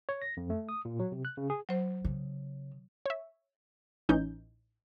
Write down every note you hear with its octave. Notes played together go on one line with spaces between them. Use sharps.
C#5
A#6
F2
A3
D#6
A#2
F#3
C3
F#6
C#3
G#4
F#3 C5
C#3
C#5 E5
A1 E3 C#4 D#4 G6